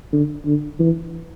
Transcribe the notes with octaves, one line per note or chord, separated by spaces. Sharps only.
D3
D3
E3